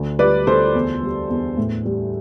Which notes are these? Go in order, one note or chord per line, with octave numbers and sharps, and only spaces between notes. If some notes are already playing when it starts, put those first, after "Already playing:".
Already playing: D2
G3 B4 D5
D2 A4 C5
E2
G3
E2
A2
G3